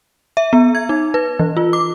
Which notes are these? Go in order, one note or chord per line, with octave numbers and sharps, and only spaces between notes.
E5
B3
G#6
D#4
B4
E3
F4
D6